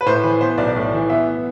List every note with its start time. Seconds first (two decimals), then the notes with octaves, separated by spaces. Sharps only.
0.01 B4
0.06 A2 C5
0.23 E3 B4
0.41 B3 C5
0.58 B1 D5
0.76 A2
0.93 E3
1.10 B3 E5